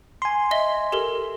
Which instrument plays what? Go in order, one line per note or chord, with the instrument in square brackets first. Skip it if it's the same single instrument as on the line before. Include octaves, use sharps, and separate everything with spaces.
[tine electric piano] G#5 C6
[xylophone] D#5 E5 G7
G4 A4 A#4